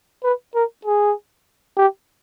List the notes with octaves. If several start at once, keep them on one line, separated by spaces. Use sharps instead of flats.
B4
A#4
G#4
G4